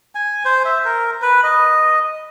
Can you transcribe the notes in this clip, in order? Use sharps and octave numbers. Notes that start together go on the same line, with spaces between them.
G#5
C5
E5
A#4
B4
D#5